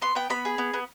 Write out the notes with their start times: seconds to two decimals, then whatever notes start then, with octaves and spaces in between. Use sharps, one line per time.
0.02 B3 C6
0.15 B3 G5
0.30 B3 B5
0.45 G#4
0.58 B3
0.74 B3